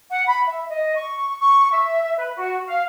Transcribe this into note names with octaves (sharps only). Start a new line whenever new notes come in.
F#5
B5
E5
D#5
C#6
C#6
E5
B4
F#4
F5